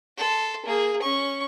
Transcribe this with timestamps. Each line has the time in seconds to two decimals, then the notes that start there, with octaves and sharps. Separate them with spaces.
0.17 A4 C6
0.65 A#3 G#4
1.02 C#4 C#6